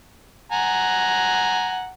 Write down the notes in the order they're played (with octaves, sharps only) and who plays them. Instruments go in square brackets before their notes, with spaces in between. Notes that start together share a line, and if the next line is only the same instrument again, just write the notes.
[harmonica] F#5 G#5 A#5